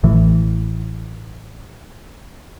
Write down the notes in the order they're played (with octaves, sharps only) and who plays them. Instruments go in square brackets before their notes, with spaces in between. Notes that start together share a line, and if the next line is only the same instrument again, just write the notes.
[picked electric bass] A1 A2 E3